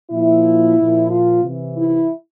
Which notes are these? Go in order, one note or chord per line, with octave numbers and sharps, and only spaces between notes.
A#2 F3 E4
A#2 F3
F4
C3 E3
E4